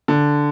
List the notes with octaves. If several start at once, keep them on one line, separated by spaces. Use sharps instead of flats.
D3